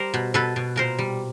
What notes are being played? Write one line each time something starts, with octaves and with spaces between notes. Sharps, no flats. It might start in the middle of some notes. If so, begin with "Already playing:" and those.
Already playing: G3 A#4 C5
B2
B2 A4 B4
B2
A#2 A#4 C5
G3